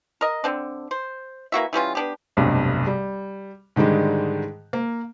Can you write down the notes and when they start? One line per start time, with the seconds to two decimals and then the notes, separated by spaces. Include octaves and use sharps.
0.21 A#4 D#5
0.44 D3 C4 D4
0.91 C5
1.52 E3 A#3 F#4 E5
1.73 E3 G3 C#4 F4
1.95 B3 D4 G4
2.37 F1 B1 G2 C3
2.87 G3
3.76 G#2 D3 D#3 G3 G#3
4.73 A#3